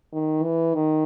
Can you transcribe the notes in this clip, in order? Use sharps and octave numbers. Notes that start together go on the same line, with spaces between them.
D#3
E3
D#3